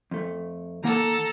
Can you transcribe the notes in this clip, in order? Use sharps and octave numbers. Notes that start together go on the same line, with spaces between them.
F2 A3
D#3 A#3 A4 F#5 A#5